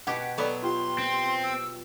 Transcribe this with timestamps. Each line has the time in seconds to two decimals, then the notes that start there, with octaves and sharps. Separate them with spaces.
0.07 B2 G4 F#5 G#6 B6
0.38 F#3 B3 A4 D5
0.63 F4 G4 C6
0.98 C4
1.43 E6